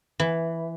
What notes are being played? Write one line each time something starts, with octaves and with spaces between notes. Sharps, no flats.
E3